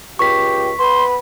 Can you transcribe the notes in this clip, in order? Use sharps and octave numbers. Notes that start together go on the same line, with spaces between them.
C#2 G4 C#6 B6
B3 B5 C6